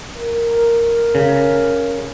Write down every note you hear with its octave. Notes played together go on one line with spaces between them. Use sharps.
A#4
C#3